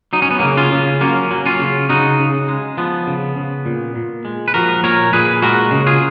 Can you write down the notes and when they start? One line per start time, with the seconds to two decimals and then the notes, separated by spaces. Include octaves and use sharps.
0.13 F#3 D#4
0.22 C#4
0.31 B3
0.39 C#3 A#3 C#4
0.57 C#4 F4
0.72 C#3
1.01 F#3 A#3 C#4
1.31 F#3
1.46 C#4 F4
1.60 C#3
1.89 C#3 D#4 F#4
2.19 C#3
2.48 G#3
2.77 F3 B3
3.07 C#3
3.36 C#3
3.66 A#2
3.95 A#2
4.25 G#3
4.48 B4
4.54 F3 F#4 A#4
4.83 A#2 A#4 C#5
5.13 A#2 G#4 B4
5.42 G#3 F#4 A#4
5.71 C#3
5.87 F4 G#4